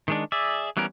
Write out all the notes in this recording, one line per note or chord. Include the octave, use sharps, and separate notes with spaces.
D#3 G#3 D4
G#4 D5 E5
E3 G3 B3 C#4 A#4